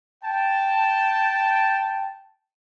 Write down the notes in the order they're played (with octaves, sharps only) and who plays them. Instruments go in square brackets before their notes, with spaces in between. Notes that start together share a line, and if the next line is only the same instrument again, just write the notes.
[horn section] G5 A5